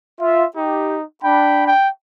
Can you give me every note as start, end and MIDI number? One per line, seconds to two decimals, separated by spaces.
0.20 0.45 65
0.20 0.45 76
0.57 1.03 63
0.57 0.97 67
1.24 1.72 62
1.24 1.63 79
1.24 1.72 83
1.68 1.89 79